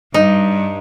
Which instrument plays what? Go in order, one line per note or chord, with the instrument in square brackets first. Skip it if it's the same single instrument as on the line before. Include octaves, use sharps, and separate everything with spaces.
[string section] G2 [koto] D#4